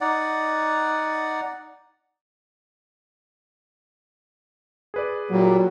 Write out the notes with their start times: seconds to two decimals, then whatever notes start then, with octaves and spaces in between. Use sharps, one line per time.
0.01 D#4 D5 F#5
4.94 G#4 B4 D5
5.31 A#2 F#3 G3 A#3